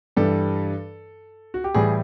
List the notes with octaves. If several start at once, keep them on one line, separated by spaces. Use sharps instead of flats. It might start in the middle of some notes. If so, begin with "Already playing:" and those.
G2 E3 G3 A4
F#4
G4
A2 E3 G3 G#4